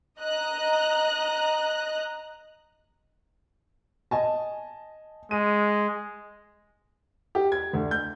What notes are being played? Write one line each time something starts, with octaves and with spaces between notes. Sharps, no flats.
D#5 A#5 F#6
D#5 G#5 A5
G#3 D#7
G4
G#6
D2
G6